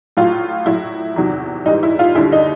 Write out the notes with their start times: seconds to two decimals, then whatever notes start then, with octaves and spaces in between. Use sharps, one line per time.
0.17 A2 F#3 F4
0.66 A2 F#3 E4
1.16 E2 C3 D#3 F#3
1.66 G#2 E3 G3 D#4
1.83 E4
1.99 F4
2.15 D#2 D3 G3 E4
2.32 D#4